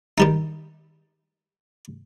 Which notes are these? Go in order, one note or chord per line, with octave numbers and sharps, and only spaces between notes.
D#3 G3 D#4